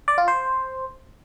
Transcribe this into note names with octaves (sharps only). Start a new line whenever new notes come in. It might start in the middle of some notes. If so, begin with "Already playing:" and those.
D5
F4
C5